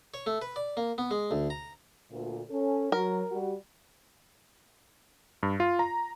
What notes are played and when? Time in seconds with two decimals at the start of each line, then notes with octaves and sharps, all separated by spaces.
0.14 C#5
0.26 A3
0.42 B4
0.56 D5
0.77 A#3
0.98 B3
1.11 G#3
1.31 D2
1.50 A#5
2.11 D2 A#2
2.50 C#4 A4
2.92 F#3 A#4
3.31 G3 F#4
5.43 G2
5.60 F4
5.79 A#5